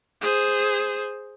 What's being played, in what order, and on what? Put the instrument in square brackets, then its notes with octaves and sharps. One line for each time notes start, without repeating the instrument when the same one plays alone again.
[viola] G#4 C5